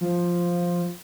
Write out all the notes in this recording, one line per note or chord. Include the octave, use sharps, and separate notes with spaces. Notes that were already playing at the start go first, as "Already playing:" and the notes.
F3